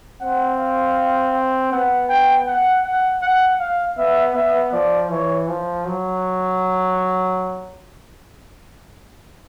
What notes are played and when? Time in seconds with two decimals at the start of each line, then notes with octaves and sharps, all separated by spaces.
0.21 C4 F#5
0.59 F5
1.72 B3 F#5
2.09 G5
2.47 F#5
2.85 F#5
3.22 F#5
3.59 F5
3.97 B3 E5
4.35 B3 E5
4.72 F3 D5
5.10 E3 C#5
5.48 F3
5.85 F#3